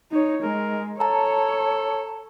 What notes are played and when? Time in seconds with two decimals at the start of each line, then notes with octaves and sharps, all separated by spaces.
0.12 D#4 C#5
0.43 G#3 A#4
1.00 A4 C#5 A5 A#5